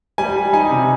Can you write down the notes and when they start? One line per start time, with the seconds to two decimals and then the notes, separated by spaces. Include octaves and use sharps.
0.18 G3 G#5
0.36 G3
0.53 D#4 G#5
0.70 C3